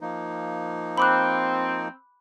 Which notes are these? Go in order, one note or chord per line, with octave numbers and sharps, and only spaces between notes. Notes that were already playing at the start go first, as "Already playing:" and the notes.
F3 A#3 D#4
C4 B5 D6 F#6